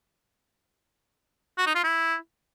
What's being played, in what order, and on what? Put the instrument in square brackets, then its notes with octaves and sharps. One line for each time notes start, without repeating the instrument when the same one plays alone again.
[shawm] F#4
D#4
F4
E4